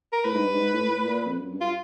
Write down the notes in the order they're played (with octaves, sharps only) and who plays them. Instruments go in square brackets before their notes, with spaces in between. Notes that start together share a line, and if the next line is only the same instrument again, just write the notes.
[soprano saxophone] A#4
[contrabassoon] A2 [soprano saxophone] B4
[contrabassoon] G#2
G2
G#2
A2
A2
A#2
F2
F#2
G2
[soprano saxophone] F4